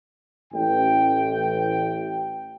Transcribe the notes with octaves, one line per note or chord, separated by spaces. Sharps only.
A1 G5